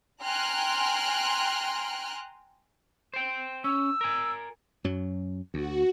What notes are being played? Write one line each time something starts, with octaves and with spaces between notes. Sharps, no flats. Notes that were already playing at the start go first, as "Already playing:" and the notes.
G5 G#5 A#5 C6 F6 F#6
C5 G5
C#4 E6
A#4 G#5
F#2 F#3
D2 F#4